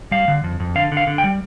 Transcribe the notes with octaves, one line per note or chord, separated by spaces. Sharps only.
G3 F5
D3
F2
F2
D3 F5
D3
F5
D3
G5
G3